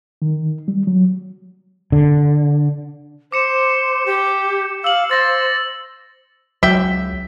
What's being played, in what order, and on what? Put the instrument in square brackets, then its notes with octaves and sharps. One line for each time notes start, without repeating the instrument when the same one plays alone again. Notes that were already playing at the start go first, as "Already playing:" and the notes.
[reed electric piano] D#3
G3
F#3
[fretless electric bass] D3
[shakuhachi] C5 [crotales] D6 C#7 E7
[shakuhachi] G4
[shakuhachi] F5 [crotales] E6 F#7
[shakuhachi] C5 [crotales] E6 A6 A#6
[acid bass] C#2 [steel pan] F#3 [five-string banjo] E5 G5 [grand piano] B6